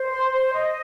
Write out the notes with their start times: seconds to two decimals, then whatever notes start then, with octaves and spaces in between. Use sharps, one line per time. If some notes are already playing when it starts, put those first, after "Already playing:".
Already playing: C5
0.11 C6
0.32 C5
0.54 D#5